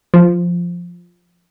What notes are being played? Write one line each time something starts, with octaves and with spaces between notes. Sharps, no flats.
F3